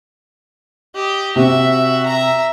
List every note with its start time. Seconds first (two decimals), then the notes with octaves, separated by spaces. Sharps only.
0.95 G4 D#5
1.36 C3 F#4 E5
2.06 E5 A#5